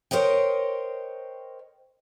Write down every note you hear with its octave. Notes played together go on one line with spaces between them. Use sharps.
A#4 C5 C#5 D#5 G5